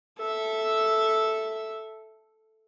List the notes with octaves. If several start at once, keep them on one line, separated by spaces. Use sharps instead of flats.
A4 E5